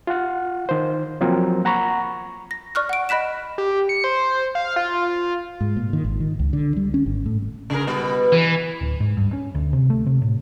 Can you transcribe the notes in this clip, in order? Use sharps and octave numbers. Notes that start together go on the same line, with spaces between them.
F4 F5 F#5
D#3 C5
F3 F#3 A#3 C4 F4 A#4
F#5 A#5 B5 C#6
A#6
D5 C#6 F6 F#6
F#5 D7
D#5 B5 F#6 B6 E7
G4
C#7
C5
F5
F4
G#2
A#2
D#3
G#1
D#3
C#2
D3
G3
C#4
G#1
A2
C#3 G#4 A#4
B2 G3 B3
E3
D1
G#2
G2
C#4
D2
C3
A3
C3
A2